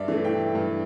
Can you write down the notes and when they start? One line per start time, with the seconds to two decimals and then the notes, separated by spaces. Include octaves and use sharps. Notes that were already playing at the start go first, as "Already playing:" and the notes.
Already playing: G2 D5 E5
0.08 E3 A3
0.24 G5
0.55 G2